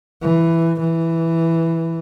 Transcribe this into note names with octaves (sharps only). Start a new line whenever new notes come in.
E3
E3